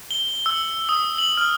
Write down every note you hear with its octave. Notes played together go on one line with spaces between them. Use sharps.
G7
E6
D#6
F#7
F6